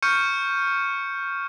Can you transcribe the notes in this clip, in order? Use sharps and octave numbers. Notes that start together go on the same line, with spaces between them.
C#6 F6 G6 C#7 D#7